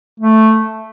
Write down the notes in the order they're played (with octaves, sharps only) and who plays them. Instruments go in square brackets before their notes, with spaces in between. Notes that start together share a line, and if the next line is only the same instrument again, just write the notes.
[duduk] A3